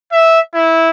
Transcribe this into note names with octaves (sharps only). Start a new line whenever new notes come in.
E5
E4